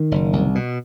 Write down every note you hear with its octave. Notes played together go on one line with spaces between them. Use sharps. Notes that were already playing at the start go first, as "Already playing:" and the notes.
Already playing: D#3
F#1
C2
B2